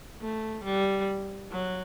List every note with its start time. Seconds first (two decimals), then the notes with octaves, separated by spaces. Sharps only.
0.22 A3
0.65 G3
1.51 F#3